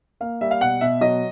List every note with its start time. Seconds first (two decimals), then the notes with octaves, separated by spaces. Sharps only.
0.20 A#3 F5
0.41 G3 E5
0.51 F5
0.61 B2 F#5
0.81 B2 E5
1.01 F#3 D#5